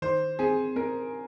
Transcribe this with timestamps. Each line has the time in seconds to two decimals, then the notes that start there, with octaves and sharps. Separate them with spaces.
0.02 D#3 C5
0.39 C4 G#4
0.76 C4 A#4